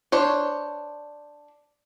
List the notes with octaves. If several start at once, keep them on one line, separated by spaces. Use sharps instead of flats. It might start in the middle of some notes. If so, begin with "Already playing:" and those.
D4 C5 C#5